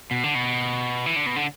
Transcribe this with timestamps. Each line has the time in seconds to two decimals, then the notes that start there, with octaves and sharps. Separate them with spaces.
0.11 B2
0.24 D3
0.35 B2
1.06 E3
1.16 D3
1.26 B2
1.36 D3